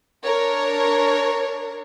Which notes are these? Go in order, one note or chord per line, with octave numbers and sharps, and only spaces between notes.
D4 A#4 C#5